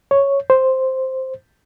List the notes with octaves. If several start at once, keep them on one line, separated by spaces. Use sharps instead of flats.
C#5
C5